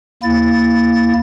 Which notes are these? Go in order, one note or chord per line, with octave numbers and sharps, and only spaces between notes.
D#2 A#3 E4 A6